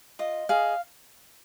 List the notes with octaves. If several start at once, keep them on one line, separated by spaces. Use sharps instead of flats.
F4 D#5
G#4 D#5 F5